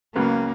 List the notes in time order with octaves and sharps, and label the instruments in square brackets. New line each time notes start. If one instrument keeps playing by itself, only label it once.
[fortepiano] C#2 C#3 F#3 B3 [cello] A#3